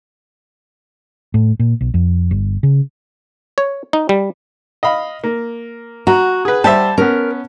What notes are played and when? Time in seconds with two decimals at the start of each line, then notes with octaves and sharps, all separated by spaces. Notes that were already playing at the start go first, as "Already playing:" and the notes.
1.34 A2
1.59 A#2
1.81 B1
1.94 F2
2.31 G1
2.63 C#3
3.58 C#5
3.93 D#4
4.09 G3
4.83 D#5 F5 B5
5.24 A#3
6.07 F#4 A#5
6.45 G#4 B4
6.64 G3 C5 E5 A5
6.98 B3 C#4 A#4